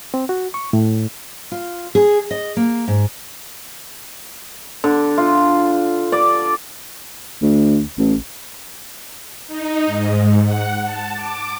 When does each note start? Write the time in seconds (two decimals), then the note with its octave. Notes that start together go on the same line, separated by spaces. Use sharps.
0.14 C4
0.29 F#4
0.54 C#6
0.73 A2
1.52 F4
1.95 G#4
2.31 D#5
2.57 A#3
2.88 G#2
4.84 D3
5.18 F4
6.12 D5
7.42 D2
7.98 A1
9.47 D#4
9.86 G#2
10.44 F#5
10.84 A5
11.13 D6